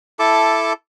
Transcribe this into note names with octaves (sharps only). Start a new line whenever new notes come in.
E4 A4 A5 D6